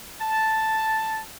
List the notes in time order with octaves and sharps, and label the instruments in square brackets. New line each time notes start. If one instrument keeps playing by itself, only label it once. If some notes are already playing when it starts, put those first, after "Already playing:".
[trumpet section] A5